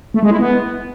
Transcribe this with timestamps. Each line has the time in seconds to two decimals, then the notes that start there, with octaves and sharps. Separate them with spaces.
0.14 A3
0.23 G#3
0.31 E4
0.39 B3